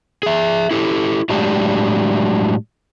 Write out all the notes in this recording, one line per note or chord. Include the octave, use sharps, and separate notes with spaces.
G#4 E5
E4 G4 A4
A2 F#3 G#3 D4 G4